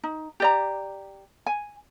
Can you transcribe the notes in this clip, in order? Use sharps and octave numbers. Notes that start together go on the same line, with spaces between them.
D#4
G4 D5 A#5
G#5